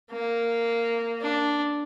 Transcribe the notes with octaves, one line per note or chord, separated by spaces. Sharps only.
A#3
D4